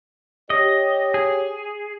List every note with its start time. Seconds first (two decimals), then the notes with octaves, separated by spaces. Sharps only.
0.50 G4 C#5 D#5
1.14 G#4